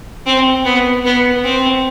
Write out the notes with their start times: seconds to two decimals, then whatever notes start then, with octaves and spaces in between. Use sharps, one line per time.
0.26 C4
0.65 B3
1.04 B3
1.43 C4